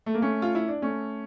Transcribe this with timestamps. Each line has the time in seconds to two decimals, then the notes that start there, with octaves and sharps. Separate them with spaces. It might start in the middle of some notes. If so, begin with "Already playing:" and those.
0.06 A3
0.14 A#3
0.22 A3 C#4
0.42 F4
0.55 E4
0.68 D4
0.82 A3 C#4